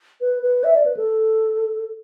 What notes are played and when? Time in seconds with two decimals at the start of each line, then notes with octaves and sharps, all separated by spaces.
0.21 B4
0.43 B4
0.64 E5
0.75 D5
0.86 B4
0.97 A4